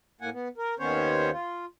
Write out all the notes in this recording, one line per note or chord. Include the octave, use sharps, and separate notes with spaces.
A2 A#3 F#5 G#5
B3
A#4
D#2 D#3 B3 C#4 C5 C#5
F4